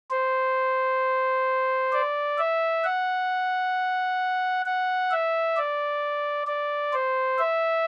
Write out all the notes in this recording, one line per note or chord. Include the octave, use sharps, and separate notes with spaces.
C5
D5
E5
F#5
F#5
E5
D5
D5
C5
E5